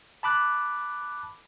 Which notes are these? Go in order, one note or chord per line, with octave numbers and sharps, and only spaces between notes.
A5 B5 D6 F#6